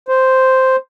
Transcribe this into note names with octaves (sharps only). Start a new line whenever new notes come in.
C5